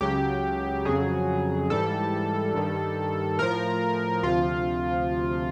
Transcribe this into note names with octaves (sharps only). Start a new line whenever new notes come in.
C#2 C#3 F#3 G4
F2 C#3 F#3 G#4
G#2 E3 G3 A4
G2 D#3 G3
A2 F3 A#4
D2 C3 F3 F4